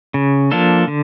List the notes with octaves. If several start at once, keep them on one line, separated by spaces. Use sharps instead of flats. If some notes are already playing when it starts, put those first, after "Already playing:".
C#3
F3 A#3 D4 A4
D3